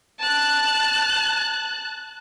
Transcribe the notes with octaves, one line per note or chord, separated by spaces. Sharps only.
A5 F#6